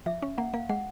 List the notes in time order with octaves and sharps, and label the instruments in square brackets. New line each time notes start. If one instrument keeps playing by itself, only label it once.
[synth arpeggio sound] F3 [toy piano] E5
[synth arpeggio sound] C#4
[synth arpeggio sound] A#3 [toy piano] F#5
[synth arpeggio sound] A#3 [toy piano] F5
[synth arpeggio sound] G#3 [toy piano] F#5